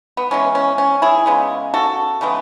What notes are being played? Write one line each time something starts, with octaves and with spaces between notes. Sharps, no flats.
B3
E3 G#3 B3 C#4
C#4
C#4
E4 G#4
C#3 G#3 B3
F#4 A4
C#3 E3 G#3 B3